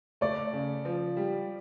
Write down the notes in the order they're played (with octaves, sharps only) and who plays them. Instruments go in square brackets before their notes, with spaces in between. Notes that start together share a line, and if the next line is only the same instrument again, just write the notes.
[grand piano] A3 [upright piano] D5
[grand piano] C#3
F3
G3